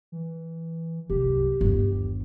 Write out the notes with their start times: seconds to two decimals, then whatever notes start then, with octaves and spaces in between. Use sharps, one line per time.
0.12 E3
1.10 C2 F#2 G4
1.61 G1 D#2